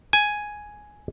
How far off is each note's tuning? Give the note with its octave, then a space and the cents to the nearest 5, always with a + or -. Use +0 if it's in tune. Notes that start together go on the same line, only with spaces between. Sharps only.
G#5 +5